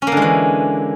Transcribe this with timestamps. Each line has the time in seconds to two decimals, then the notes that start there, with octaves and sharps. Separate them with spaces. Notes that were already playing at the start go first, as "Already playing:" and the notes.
0.02 C#4
0.07 A#3
0.12 D3
0.17 G#3
0.22 E3